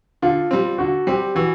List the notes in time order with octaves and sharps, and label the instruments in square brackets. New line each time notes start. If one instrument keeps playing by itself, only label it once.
[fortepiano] D3 [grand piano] F4
[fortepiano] G3 C4
[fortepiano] D3 [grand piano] F#4
[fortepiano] G3 C4 [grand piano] G4
[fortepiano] E3 [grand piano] F#4